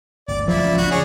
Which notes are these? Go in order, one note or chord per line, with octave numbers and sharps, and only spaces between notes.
G1 D2 D5
F#2 F3 A3 E4 D5
D#1 C#2 C#4
F#1 D2 D4 F#4
C#3 G#4 C#5 D5